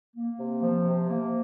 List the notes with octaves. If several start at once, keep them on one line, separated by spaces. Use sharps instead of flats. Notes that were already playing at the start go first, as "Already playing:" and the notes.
A#3
C3
F3
C3
A#3